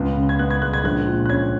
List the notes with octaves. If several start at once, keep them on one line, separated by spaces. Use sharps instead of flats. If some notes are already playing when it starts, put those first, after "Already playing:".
Already playing: C#2 B3
C#3
G#6
B3 F#6
G#6
G#3 F#6
G#6
A#1 F#6
A#2
F#6
C#4 G#6